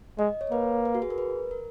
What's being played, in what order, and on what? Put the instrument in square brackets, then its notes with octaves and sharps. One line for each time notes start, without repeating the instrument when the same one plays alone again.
[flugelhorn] G#3 [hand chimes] D#5
[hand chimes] C#5
[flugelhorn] A#3 [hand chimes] B4
[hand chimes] B4
F#4
G#4
A#4
B4
A#4